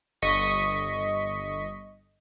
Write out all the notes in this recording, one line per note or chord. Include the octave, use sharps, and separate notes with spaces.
G1 D#5 C#6 B6